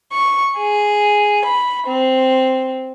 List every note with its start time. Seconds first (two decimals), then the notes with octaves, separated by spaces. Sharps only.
0.12 C#6
0.58 G#4
1.44 B5
1.86 C4